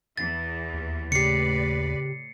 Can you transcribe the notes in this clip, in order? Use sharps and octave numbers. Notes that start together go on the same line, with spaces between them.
E2 E3 A6
D#2
A2 C#3 G4 B4 D5 C7 C#7